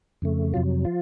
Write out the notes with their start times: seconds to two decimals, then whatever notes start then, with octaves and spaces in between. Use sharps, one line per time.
0.22 F2 C#3 A3
0.54 F2 C3 F#3 F4
0.85 F3 F4